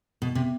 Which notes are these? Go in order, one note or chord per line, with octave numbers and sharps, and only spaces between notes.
B2
C3